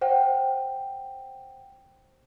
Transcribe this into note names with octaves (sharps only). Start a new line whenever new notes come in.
C5 F#5 G5